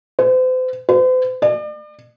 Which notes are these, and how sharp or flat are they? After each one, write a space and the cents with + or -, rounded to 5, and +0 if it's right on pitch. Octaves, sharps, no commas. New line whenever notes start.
C5 -40
C5 -45
D5 +40